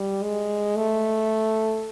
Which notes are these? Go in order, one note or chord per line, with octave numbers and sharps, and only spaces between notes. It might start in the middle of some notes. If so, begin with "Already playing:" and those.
Already playing: G3
G#3
A3